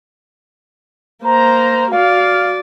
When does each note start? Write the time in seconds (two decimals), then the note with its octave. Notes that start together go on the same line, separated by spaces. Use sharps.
1.24 A#3 C5 A#5
1.92 F#4 D5 F5